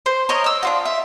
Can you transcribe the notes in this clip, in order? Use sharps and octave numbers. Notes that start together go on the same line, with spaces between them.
C5
A#4 C#5 D#5
D#5 E6
D4 F4 F#4
E5